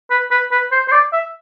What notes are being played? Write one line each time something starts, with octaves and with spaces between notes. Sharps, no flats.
B4
B4
B4
C5
C5
D5
E5